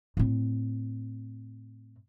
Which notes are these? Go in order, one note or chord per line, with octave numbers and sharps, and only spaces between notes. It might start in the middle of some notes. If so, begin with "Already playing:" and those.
A2 C4